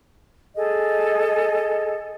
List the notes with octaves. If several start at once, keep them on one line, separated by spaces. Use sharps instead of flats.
G#4 A4 D#5